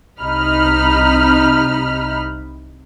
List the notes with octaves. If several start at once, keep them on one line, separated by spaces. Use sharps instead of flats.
C2 C3 D#4 B5 F6